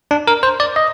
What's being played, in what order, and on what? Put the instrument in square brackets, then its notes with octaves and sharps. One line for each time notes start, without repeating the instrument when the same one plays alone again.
[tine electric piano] D4
A#4
C5
D5
D#5